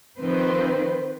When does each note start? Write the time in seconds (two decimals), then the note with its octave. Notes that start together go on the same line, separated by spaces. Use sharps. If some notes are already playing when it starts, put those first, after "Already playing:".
0.18 D#3 F3 C4 B4 C5